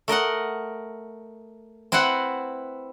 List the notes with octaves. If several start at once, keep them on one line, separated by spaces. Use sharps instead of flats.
A3 A#4 D#5 F#5
C4 E4 B4 C5 F#5